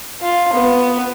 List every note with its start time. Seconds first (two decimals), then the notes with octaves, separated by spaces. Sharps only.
0.22 F4
0.53 B3